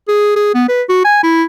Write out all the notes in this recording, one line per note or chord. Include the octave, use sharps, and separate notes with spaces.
G#4
G#4
B3
B4
F#4
G#5
E4